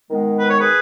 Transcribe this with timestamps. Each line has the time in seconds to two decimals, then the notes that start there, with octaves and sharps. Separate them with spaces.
0.09 D#3 G#3 B3
0.38 B4
0.49 C#5
0.59 G#4 B4